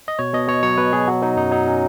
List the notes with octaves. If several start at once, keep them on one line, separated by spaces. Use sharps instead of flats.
D#5
B2 C#5
B2 D#5
B2 C#5
F#3 C#5
B2 B4
B2 G#4
F#3 F#4
F#3 D#4
F#2 D#4
F#3 D#4
C#4